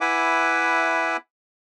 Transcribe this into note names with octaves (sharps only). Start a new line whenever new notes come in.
E4 B4 E5 F#5 G#5 D6